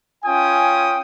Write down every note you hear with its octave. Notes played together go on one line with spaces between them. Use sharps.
C#4 F4 G5 G#5 D#6